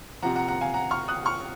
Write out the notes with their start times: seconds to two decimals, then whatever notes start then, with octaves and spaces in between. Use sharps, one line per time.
0.22 C3 F3 F#5 A#5
0.35 F#5 A#5
0.48 F#5 A#5
0.61 F5 G#5
0.74 F#5 A#5
0.91 C#6 F6
1.08 D#6 F#6
1.25 C#6 F6